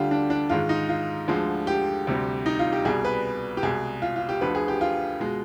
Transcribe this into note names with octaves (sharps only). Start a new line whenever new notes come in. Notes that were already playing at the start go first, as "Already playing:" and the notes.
Already playing: D2 D3 G3 F4 G4
D4
D4
G#2 D#3 G#3 F4
D#4
F4
D2 D3 F3 G#3
G4
D2 C3 G3
D#4
F4
G4
C2 B2 G3 G#4
B4
G4
C2 B2 G#3 G#4
F4
F4
G4
D2 D3 F3 B4
G#4
G4
F4
B2 G#3